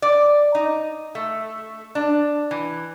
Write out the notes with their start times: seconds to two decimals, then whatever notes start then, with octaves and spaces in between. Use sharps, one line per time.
0.02 D5
0.55 D#4
1.15 A3
1.95 D4
2.51 E3